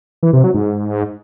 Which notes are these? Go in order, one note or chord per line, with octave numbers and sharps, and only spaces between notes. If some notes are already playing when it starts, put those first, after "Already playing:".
E3
C3
F#3
G#2